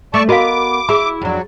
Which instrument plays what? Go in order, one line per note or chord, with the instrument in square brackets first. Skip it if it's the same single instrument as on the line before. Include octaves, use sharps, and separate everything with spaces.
[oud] A3 [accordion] D5 A5 C#6
[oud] B3 A#4 D#5 [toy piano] F#4 F5 [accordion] D6
[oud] E4 [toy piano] G#4 B5
[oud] F2 D4 [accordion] F#3